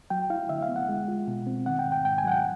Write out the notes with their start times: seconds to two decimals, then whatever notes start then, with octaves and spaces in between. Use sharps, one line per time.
0.10 F#3 G5
0.30 E4 F5
0.49 D3 E5
0.63 F5
0.69 B3
0.76 F#5
0.89 G#3
1.08 F4
1.28 B2
1.47 C4
1.66 D#3 F#5
1.79 G5
1.86 G#2
1.92 G5
2.05 G#2 G5
2.18 G#5
2.25 F#3 F#5
2.31 G5